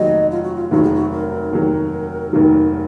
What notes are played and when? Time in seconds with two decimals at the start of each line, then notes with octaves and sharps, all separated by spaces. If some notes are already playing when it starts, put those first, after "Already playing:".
Already playing: F1 D#2 D#3 F#3 D#5
0.31 F4
0.43 F#4
0.55 F4
0.71 F1 D#2 D#3 F#3 F#4
0.83 G#4
0.94 F#4
1.11 A#4
1.52 F1 D#2 D#3 F#3
2.33 F1 D#2 D#3 F#3